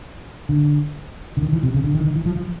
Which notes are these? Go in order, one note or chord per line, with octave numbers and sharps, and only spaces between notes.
D3
D3
D#3
E3
C3
C#3
D3
D#3
D#3
E3
F3
F3